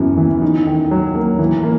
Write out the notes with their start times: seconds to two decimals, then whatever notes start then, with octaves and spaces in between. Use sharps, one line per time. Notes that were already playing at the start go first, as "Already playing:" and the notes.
Already playing: F#2 E3 B3
0.17 E3
0.42 D#4
0.66 D#3
0.91 F#3
1.15 A#3
1.39 E3
1.63 A#3